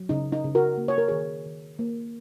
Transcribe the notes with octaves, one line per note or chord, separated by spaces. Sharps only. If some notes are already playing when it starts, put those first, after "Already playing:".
Already playing: F#3
C#3 D#4
D#4
C#3
F#4 A#4
A#3
C#5
A#4
D#3 G#4 C#5
D#3
A#3